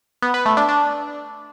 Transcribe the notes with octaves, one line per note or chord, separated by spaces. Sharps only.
B3
B4
A3
D4
D4